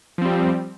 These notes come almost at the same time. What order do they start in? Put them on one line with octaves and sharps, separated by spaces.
F3 C4 G3